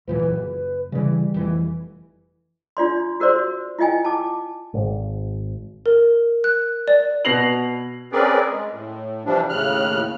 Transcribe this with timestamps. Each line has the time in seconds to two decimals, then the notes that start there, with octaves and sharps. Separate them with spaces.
0.07 C#2 A#2 E3 B4
0.23 F#1
0.92 C#3 E3 G3
1.34 F1 E3
2.77 D4 F4 D5 C6
3.20 F#4 A#4 C5 D5 C6
3.79 E4 F4 D#5 G5 G#5
4.05 A5 D6
4.74 G#1
5.86 A#4
6.44 F#6
6.88 D5
7.25 B2 B4 A#6 C7 F7 F#7
8.12 C4 C#4 G#4 A#4 B4 D5
8.49 G#3
8.71 A2
9.25 C3 E3 F3 G3 D4
9.49 D#2 A2 C#3 F6 F#6